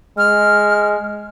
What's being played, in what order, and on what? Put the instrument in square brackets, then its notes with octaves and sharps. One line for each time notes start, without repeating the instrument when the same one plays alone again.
[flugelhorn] G#3 [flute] F6